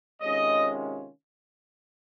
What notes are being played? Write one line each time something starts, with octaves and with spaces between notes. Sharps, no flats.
C3 D#3 G#3 C#4 F4 C#5 D#5